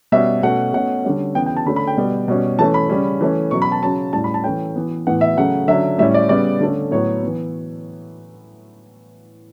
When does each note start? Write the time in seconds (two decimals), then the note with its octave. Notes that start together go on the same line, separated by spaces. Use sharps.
0.12 B2 G3 C#4 E5
0.43 B2 A3 C#4 F#5
0.74 B2 A3 C#4 F#5
1.04 D3 G3 C#4
1.35 C#3 E3 B3 G5
1.46 G5
1.56 A5
1.66 D3 A3 C#4 B5
1.76 B5
1.87 G5
1.97 B2 G3 B3
2.28 B2 G3 C#4
2.59 E3 A3 C#4 A5
2.74 B5
2.90 C#3 G3 C#4
3.21 E3 A3 C#4
3.51 B2 F#3 C#4 C#6
3.62 B5
3.72 A5
3.83 C#3 F#3 C#4 A5
4.13 A2 G3 C#4 A5
4.24 B5
4.34 A5
4.44 E3 A3 C#4 G5
4.76 E3 B3
5.07 A2 E3 B3 F#5
5.21 E5
5.37 C#3 F#3 A3 F#5
5.68 D3 F#3 C#4 E5
5.99 A2 G3 C#4 E5
6.14 D5
6.29 C#3 G3 B3 D5
6.61 D3 A3 C#4
6.91 A2 F#3 B3 C#5
7.23 E3 B3